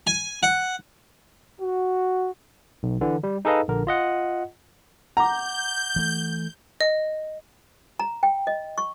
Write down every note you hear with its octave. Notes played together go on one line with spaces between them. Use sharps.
G#5
F#5
F#4
B1
D3 E3
G3
D#4 G#4 A4 B4 D#5 F5
A#1 D3 A#4
F4 D#5 F#5
F#5 A#5 D6 G6
E3 A3
D#5
A#5
G5
D#5
C#6